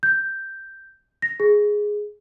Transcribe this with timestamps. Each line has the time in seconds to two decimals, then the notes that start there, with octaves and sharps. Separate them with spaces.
0.03 G6
1.22 A#6
1.40 G#4